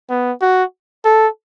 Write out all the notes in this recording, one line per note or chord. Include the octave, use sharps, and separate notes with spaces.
B3
F#4
A4